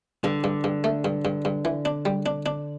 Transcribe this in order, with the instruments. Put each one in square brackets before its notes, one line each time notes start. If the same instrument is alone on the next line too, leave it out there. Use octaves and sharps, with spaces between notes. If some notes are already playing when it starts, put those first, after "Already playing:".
[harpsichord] G2 [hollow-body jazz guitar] D3
[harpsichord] G2
G2
A3
G2
G2
G2
E3
D4
G3
D4
D4